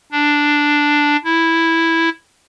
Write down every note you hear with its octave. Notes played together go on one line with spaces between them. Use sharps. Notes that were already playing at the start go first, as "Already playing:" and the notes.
D4
E4